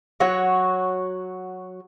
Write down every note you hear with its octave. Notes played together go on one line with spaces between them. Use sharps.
F#3 F#4 C#5